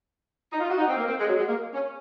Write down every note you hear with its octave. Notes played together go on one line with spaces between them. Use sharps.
D#4
F4
F#4
D#4
C4
A#3
C4
G#3
F#3
G#3
A#3
C#4